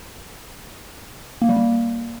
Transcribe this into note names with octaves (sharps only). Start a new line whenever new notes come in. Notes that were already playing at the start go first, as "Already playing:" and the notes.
A#3
G3
A#3